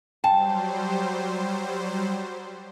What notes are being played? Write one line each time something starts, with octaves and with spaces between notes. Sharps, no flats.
F#3 G3 C5 G5 A5